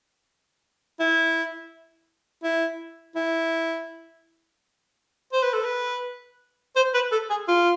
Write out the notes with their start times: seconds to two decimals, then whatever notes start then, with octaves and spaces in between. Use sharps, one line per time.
1.00 E4
2.44 E4
3.16 E4
5.33 C5
5.43 B4
5.53 A4
5.64 B4
6.76 C5
6.94 B4
7.12 A4
7.30 G#4
7.48 F4